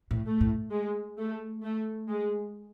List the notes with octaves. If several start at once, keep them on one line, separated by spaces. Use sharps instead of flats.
A2
A3
A2
G#3
A3
A3
G#3